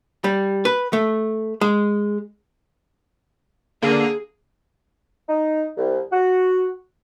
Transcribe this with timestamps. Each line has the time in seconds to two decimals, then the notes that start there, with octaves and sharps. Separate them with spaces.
0.24 G3
0.65 B4
0.93 A3
1.61 G#3
3.82 D3 A#3 G#4
5.29 D#4
5.78 C2
6.12 F#4